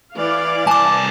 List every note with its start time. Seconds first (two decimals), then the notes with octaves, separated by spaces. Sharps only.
0.14 E3 D5 F5
0.67 C2 G#5 A5 D6